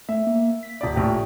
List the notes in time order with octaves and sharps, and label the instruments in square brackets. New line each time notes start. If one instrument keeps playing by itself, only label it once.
[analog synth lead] A3 [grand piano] E5
[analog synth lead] A#3
B6
[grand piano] D#1 D5
A#1 A2 G4